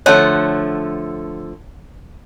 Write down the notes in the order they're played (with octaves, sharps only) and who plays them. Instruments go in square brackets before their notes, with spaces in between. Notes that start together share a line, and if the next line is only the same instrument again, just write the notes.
[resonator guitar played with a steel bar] D3 F3 A3 [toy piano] C#5 A5 C6 [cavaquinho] F#5